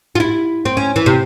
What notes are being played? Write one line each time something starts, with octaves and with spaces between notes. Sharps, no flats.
F4
E4
C4
C#4
E3
C3